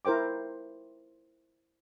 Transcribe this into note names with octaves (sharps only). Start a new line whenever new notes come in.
E4 A#4 C5 G5 D6